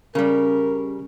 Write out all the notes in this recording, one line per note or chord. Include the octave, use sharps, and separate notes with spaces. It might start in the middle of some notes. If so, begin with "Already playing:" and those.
C#3 G3 C#4 A#4